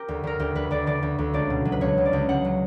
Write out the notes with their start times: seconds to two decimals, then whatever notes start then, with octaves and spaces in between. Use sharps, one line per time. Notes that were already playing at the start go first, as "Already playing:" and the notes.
Already playing: G4 A#4
0.08 D2
0.24 D2 A#4
0.39 D2 G4
0.55 D2 B4
0.71 D2 D5
0.87 D3 D5
1.03 D2
1.19 D2
1.34 C#2 D5
1.50 B2
1.65 F#3
1.72 B4
1.81 C#2 C#5
1.98 F#3
2.06 D5
2.13 C#2
2.29 C#2 F#5
2.45 F#3